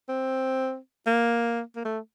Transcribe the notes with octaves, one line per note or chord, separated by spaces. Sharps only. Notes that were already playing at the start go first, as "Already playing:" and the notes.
C4
A#3
A#3
A3